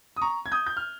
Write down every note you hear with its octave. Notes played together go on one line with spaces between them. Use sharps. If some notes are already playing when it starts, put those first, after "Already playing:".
D#6
A#5 C#6
G#6
D#6 G6
G6
F6